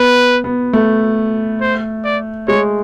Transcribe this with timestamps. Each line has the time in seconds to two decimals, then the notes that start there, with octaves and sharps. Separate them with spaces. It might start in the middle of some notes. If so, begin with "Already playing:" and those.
Already playing: B3 B4
0.44 B3
0.73 A3
1.61 C5
2.04 D5
2.48 G#3 C#5